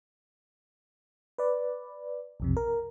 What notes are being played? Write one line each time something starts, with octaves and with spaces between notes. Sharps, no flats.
B4 D5
B1 F2 C3
A#4